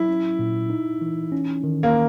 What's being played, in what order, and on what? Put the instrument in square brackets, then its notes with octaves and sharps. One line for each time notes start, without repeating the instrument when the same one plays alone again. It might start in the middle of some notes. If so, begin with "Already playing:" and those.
Already playing: [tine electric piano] F#3 [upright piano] E4
[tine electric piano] C#4
A#2
D#4
E3
C#4
D#3
[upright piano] A#3